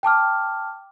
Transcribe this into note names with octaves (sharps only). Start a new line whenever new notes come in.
G5 A5 D6 F6